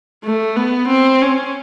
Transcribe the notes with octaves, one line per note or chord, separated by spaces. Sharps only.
A3
B3
C4
C#4